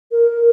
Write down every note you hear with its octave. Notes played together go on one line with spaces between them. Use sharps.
A#4